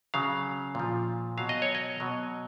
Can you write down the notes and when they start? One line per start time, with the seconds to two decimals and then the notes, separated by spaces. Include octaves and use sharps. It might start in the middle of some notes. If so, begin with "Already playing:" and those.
0.14 C#3 F#3 F5
0.75 A#2 F3
1.37 B2 F#3 F5
1.49 D#5
1.62 C#5
1.75 D#5
2.00 B2 F#3